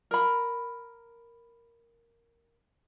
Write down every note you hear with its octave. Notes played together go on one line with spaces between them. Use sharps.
A#4 B5